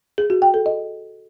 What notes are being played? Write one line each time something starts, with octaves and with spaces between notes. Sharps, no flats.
G#4
F#4
G5
A4
D#5